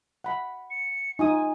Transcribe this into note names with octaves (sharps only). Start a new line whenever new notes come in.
F#5 B5
C#7
D#4 F4 G#5 D#6